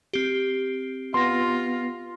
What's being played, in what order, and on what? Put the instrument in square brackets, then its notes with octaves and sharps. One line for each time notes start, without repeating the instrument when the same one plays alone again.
[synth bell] C4 G4
[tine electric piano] B3 A#6 [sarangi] F4 [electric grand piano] C6